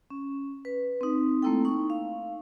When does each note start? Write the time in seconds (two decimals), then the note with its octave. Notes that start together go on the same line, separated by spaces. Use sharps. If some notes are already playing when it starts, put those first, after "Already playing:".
0.10 C#4
0.65 B4
1.01 C4 D#4
1.42 A3 A#3 C4 E4 A4 G5
1.65 D#4 C#6
1.90 F5